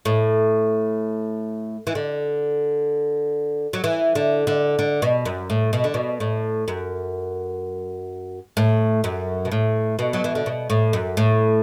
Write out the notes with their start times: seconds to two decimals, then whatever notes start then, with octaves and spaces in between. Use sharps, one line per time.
0.05 A2
1.87 E3
1.95 D3
3.73 F#3
3.84 E3
4.15 D3
4.47 D3
4.79 D3
5.02 B2
5.25 F#2
5.50 A2
5.73 B2
5.84 D3
5.94 B2
6.20 A2
6.68 F#2
8.57 A2
9.04 F#2
9.45 B2
9.52 A2
9.99 B2
10.13 F#3
10.24 E3
10.35 D3
10.46 B2
10.70 A2
10.93 F#2
11.17 A2